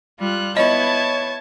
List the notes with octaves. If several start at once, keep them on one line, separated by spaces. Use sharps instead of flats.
G3 F4 F#6
B3 E4 C#5 D#5 A5 G#6